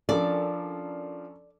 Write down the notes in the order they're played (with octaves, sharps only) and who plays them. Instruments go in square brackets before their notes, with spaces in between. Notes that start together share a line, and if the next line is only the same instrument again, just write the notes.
[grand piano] F3 D4 [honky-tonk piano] C#4 A4 A#4 [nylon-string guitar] D5